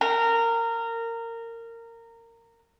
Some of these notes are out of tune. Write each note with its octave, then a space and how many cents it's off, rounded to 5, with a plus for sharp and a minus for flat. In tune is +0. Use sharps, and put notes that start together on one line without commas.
A#4 -20